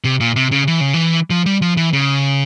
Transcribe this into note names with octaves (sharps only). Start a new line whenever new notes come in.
C3
A#2
C3
C#3
E3
C#3
E3
F3
G3
F3
E3
C#3